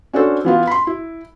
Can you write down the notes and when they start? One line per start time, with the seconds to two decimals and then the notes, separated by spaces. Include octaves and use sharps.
0.13 C#4 D4 F#4 A4 C5
0.45 E3 B3 F4
0.67 B5 C6
0.87 E4